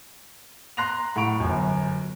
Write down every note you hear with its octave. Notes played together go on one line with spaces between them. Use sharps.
A#5 C6 F#6 A#6 C7 F7
A2 F#5 B5 C#6 D7 F7
G1 F#2